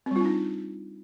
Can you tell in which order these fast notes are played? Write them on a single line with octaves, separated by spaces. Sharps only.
C4 G3 F4 D4 D#4